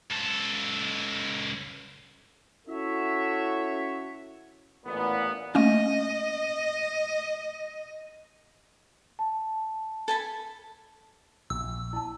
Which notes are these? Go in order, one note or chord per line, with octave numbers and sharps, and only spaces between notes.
C#2 A4
C#4 E4 F#4 A4 C#5 E5
A1 A#2 B3
A3 A#3 C#4 D#5
A5
A4 G#5 B5
A#1 E6
E4 A5